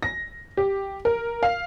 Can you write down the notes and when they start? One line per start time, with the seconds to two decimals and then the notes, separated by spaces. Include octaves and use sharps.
0.03 A#6
0.57 G4
1.05 A#4
1.43 F5